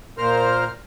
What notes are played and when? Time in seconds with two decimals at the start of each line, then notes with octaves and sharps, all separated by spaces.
0.18 A#2 A#4 C5 F6